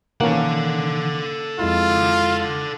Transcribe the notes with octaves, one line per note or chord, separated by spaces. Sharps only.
B2 D#3 E3 A#3 C#4 A4 F#5
F2 G#3 E4 F4